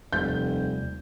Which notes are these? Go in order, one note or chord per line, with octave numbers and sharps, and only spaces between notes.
F1 D#2 C3 G3 G6